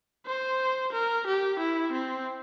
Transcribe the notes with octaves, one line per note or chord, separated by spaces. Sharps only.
C5
A#4
G4
E4
C4